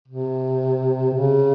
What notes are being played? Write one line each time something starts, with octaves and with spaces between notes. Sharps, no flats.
C3
C#3